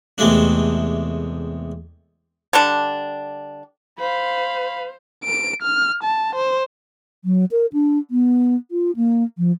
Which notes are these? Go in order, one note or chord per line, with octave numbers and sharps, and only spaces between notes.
E2 C3 G#3 A3 D4
D3 G3 D4
C5 F5 B5
D7
F6
A5
C5
F#3
A#4
D4
B3
F4
A#3
F3